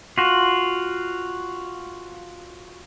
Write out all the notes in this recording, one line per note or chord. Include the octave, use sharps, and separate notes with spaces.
F4 F#4